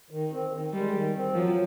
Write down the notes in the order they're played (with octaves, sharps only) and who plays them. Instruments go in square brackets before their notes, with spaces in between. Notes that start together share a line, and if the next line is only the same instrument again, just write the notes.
[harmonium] D#3
C4
D#3
[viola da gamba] G3 [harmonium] G#3
[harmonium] D#3
C4
[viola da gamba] F3 [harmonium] F#3